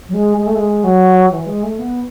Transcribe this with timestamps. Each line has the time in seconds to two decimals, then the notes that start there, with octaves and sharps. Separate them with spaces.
0.09 F#3
0.14 G#3
0.37 G#3
0.47 A3
0.55 G#3
0.84 F#3
1.31 E3
1.46 G#3
1.63 A3
1.79 B3